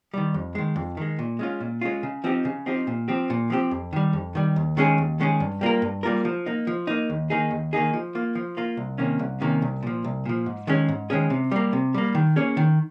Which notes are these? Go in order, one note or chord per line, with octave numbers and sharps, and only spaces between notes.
D#3 G3
F2
D#3 G#3
F2
D#3 G#3
A#2
G#3 C#4 F4
A#2
G#3 C#4 F4
C#3
F3 C4 D#4 G4
C#3
F3 C4 D#4 G4
A#2
F3 C4 G4
A#2
F3 C4 G4
F2
D#3 G3
F2
D#3 G3
D#2
D#3 G#3 C#4 G#4
D#2
D#3 G#3 C#4 G#4
G2
G3 A#3 F4 A#4
G2
G3 A#3 F4 A#4
F3
A#3 D#4
F3
A#3 D#4
D#2
D#3 A#3 D#4 G#4
D#2
D#3 A#3 D#4 G#4
F3
A#3 F4
F3
A#3 F4
C2
C3 D#3 A#3 C#4
C2
C3 D#3 A#3 C#4
C2
A#2 F3
C2
A#2 F3
G#2
D#3 G#3 C#4 G#4
G#2
D#3 G#3 C#4 G#4
C3
G3 A#3
C3
G3 A#3
D#3
A#3 C#4 G#4 C#5
D#3